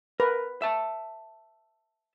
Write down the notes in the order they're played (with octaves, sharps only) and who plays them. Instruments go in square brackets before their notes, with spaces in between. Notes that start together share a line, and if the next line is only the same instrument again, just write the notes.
[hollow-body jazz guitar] A#4 [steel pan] B4
[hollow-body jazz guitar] E5 A5